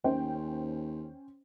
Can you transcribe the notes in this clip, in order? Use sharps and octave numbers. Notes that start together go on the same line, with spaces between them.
D#2 C#4 C5 G5